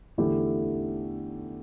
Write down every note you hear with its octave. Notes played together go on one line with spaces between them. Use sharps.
E2 D3 A3 E4 G4